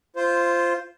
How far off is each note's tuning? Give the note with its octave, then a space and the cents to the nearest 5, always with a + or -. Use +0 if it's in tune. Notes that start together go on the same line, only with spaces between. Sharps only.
F4 -15 C5 +0